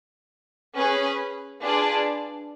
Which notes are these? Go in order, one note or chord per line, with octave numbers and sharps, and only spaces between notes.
C#4 G#4 B4
D4 F4 G#4 B4 D5